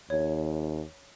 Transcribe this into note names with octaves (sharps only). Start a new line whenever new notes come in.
D#2 C#5